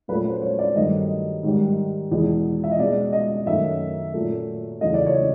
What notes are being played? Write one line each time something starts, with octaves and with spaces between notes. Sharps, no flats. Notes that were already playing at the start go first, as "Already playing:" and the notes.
A#2 F#3 A3 B4
C5
C#5
D5
G2 D#3 F#3 A3 D#5
G#2 D#3 G3
E2 B2 G#3
E5
D#5
B2 G#3 D5
D#5
F#2 D#3 F#3 A3 E5
A#2 F#3 A3
E2 C#3 F#3 A3 D#5
D5
C#5